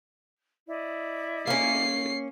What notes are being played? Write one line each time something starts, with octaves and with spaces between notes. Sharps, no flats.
E4 D5 D#5
A#3 C#4 C7